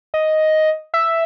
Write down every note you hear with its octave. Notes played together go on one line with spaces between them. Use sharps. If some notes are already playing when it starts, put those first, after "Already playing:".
D#5
E5